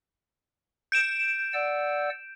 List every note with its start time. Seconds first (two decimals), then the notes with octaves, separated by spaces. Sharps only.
0.92 G6 D7 E7
1.53 D5 F#5 E6